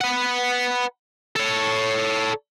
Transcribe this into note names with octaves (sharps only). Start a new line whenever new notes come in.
B4 F#5
A4 C#5